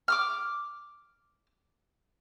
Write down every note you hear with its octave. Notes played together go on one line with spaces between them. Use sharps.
D6 D#6 F6